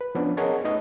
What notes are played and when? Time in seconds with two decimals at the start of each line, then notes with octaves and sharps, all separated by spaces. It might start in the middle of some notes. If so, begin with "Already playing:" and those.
0.01 B4
0.15 F3 B3 C#4 D4
0.37 G#4 A#4 C#5 D#5 F#5 A5
0.64 A3 D#4 B4 D#5